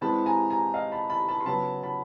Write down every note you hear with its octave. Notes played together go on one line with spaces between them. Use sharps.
A2 E3 G#3 C4 A5 B5
G#5 A#5
G#5 A#5
D#5 F5
A5 B5
A5 B5
A5 B5
C6
C#3 F#3 B3 A5 B5
A5 B5